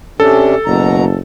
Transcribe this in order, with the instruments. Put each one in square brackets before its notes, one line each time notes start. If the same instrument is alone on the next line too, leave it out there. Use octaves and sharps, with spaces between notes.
[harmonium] C3 C#4 D4 [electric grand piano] A4
[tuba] F#1 [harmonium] B2 F#3 A#5